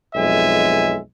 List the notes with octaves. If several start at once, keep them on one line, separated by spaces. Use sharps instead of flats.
B1 F2 G#3 E5 G#5